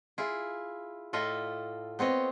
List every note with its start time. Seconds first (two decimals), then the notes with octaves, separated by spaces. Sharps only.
0.18 E4 F4 G#4
1.13 A2 F4 A4 D#5 E5
1.99 B3 C4 C#5 D#5